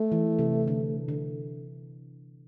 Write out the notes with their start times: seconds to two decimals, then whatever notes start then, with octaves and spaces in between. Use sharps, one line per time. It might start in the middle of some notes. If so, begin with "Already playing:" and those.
Already playing: A3
0.12 E3
0.39 C3
0.68 D3
1.08 D3